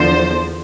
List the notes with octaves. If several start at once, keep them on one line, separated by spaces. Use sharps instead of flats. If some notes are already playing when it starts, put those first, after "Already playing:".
Already playing: E2 D3 F3 C5